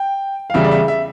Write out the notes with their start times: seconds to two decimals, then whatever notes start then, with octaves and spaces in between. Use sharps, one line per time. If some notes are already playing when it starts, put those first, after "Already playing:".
Already playing: G5
0.50 F5
0.54 E2 C#3 G3 E5
0.65 D5
0.71 E5
0.88 E5